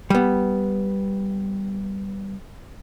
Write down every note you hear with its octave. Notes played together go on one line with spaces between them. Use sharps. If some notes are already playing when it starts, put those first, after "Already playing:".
G3 B3